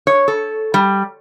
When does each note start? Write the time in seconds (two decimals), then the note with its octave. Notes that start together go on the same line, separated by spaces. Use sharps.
0.07 C#5
0.28 A4
0.74 G3